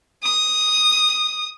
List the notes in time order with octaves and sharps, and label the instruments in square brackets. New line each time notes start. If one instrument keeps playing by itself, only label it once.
[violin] D#6